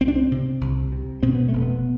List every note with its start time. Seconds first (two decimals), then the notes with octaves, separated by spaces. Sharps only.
0.01 C2 C4
0.08 D4
0.16 C4
0.31 C3
0.61 C2
0.92 C3
1.23 B2 C4
1.35 B3
1.49 F1 A3
1.62 B3